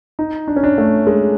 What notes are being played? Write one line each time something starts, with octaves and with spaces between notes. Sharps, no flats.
D#4
D4
C#4
D4
A3
G#3